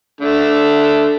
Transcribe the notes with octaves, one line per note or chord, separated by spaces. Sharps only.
D3 A3